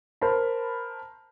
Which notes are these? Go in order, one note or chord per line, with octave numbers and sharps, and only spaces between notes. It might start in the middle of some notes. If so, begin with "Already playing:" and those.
A#4 C5 A5 B5